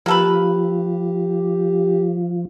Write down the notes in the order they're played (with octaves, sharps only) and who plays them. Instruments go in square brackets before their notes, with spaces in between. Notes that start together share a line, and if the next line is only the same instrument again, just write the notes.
[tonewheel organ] F3 [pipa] A#3 A4 B4 [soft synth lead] G4